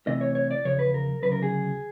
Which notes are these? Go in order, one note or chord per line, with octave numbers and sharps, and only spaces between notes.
C2 C3 E3 A3 D#5
C#5
C#5
D5
E2 C#3 F3 C#5
B4
A#4
D2 C#3 F#3 B4
A#4
G#4